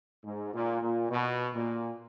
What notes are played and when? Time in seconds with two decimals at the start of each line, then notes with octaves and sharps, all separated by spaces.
0.24 G#2
0.53 A#2
0.81 A#2
1.10 B2
1.53 A#2